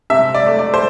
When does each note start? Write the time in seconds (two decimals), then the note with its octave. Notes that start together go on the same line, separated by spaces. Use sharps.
0.10 C3 E5
0.34 D5
0.46 A3
0.59 D5
0.74 C5